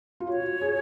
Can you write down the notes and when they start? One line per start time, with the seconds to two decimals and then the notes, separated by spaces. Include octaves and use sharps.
0.20 F4
0.27 F#4 C#5
0.61 G#4